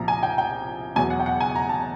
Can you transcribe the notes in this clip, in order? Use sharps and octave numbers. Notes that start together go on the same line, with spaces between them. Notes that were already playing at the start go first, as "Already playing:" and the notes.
Already playing: C2 A#2 F3 A#5
G#5
G5
G5
E2 B2 F#3 G#5
F#5
G5
F#5
G#5
A#5
A5